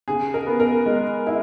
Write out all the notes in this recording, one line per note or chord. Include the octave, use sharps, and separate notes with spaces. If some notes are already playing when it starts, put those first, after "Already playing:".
C#3 G#4
A#4
B3
A#4
G#3
E4